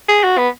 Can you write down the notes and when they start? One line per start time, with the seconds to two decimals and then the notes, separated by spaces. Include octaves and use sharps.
0.08 G#4
0.23 F#4
0.37 B3